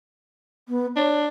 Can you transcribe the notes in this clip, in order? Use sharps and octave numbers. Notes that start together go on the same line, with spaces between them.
B3
D4 C#5